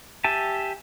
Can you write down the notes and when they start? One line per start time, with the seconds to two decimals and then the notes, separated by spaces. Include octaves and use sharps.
0.24 G4 E5 G#5 A5